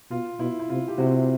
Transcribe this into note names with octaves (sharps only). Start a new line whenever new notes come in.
B2 F4
B2 E4
E4
C3 F4
G4
C3 E4 F#4